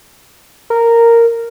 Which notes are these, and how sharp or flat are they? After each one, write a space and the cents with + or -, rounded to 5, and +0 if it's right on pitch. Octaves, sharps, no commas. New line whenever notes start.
A#4 -10